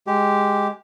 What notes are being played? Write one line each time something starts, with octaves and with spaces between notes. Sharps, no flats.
G#3 G4